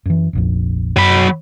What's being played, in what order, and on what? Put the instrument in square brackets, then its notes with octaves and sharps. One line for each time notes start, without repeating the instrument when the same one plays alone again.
[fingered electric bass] F#2 E3
F1 A#1 F2
[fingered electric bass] F#2 [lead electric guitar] F#3 B5